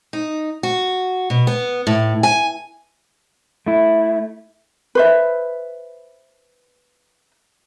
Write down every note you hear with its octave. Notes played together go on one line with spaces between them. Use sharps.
D#4
F#4
B2
B3
A2
G#5
A3 E4
B4 C5 E5